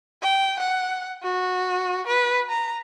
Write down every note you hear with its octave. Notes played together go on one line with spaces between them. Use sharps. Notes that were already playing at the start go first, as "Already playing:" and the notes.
G5
F#5
F#4
B4
A#5